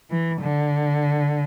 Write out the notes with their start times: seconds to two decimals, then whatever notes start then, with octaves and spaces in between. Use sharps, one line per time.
0.10 E3
0.41 D3